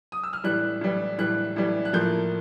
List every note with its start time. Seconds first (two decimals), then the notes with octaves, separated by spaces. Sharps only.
0.12 D#6
0.23 E6
0.33 F6
0.44 A2 E3 G3 F#6
0.81 A2 E3 G3
1.18 A2 E3 G3 F#6
1.56 A2 E3 G3
1.85 F#6
1.93 A2 F3 A#3 G6